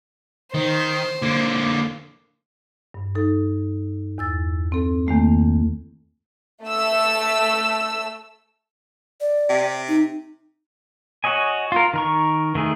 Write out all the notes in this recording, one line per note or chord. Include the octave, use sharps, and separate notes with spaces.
D#3 C5
D3 A#3
G2
D#4 A4
E2 E6 A6
C4 A4
E2 D#3 A3 A#3
A3 E6
D5
C3
D#4
F#4 C#5 D#5 G#5
F4 A#4
D#3 A#4 C#6
D#3 A3 G#4